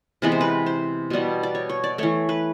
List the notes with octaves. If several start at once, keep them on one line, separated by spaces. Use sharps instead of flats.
C3 E3 G#3 B3 B4
C5
B4
C5
B2 G3 B3
D5
C#5
C#5
D5
E3 A3 C#5
B4